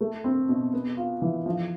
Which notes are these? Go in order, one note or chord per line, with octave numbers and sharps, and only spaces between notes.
A3
C4
B2
B3
F4
E3
F3